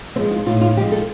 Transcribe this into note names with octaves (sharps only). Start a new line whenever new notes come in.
F3 G#3 C4
F4
A2 F4
F4
F3 G#3 G4
A4